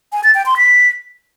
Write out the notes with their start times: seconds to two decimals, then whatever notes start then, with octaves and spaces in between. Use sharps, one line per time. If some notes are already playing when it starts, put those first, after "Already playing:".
0.12 G#5
0.24 A6
0.35 G5
0.46 C6
0.57 B6